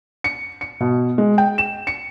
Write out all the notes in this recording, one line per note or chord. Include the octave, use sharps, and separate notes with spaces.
C#7
C#7
B2
G#3
G5
E7
C#7